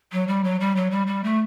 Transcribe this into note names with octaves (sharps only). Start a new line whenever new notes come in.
F#3
G3
F#3
G3
F#3
G3
G3
A3